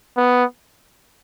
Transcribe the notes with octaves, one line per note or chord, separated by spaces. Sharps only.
B3